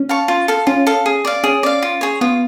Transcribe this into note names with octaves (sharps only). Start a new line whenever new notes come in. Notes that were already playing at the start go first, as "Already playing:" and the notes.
Already playing: C#4
F5 A5 C#6
F4
A4 F5
C#4 F4
A4 F5
G#4
D5 F5
C#4 G#4
D5 F5
F4
G#4 C#5
B3 F4